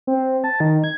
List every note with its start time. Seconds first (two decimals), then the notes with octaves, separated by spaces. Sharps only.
0.07 C4
0.44 A5
0.60 D#3
0.84 G#6